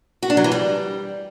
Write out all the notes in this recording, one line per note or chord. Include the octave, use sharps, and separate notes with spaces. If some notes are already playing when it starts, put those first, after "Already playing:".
F#4
D4
F#3
E3
G3